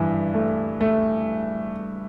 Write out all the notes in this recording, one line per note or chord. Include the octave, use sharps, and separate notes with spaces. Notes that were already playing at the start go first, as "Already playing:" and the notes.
Already playing: G2 E3
A3
A3